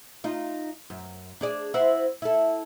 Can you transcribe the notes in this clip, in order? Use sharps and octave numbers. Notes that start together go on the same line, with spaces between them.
D#4 F4
F#2
D4 G#4 D5
E4 F#4 C5
E4 A4